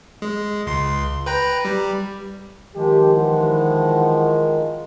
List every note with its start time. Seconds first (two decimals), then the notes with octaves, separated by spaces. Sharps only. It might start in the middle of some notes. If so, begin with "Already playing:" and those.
0.22 G#3
0.67 C#2 C6
1.26 B4 G5 A#5
1.65 G3
2.76 D#3 F3 G#3 G4
3.15 E3 E4 F#5